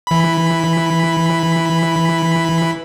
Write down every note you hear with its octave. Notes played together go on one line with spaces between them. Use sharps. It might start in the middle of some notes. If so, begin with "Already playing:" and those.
E3 B5